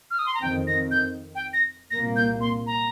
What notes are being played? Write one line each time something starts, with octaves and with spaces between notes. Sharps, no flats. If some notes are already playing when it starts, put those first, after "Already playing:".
F6
D#6
C6
A#5
F2 D#3 C4 G5
A#6
G6
G5
A#6
C2 A#2 A#3 A#6
G6
C6
A#5